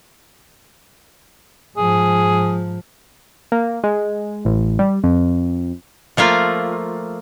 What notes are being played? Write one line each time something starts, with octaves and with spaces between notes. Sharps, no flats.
G#2 F3 G#4
A#3
G#3
A1
G3
F2
F3 A3 A#3 F4